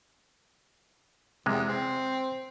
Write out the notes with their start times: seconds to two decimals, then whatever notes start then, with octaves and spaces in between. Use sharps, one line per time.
1.46 E2 C3 G#3
1.68 C4